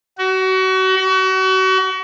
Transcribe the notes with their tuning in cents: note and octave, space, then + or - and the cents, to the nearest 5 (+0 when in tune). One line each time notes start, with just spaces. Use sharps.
F#4 +30
F#4 +35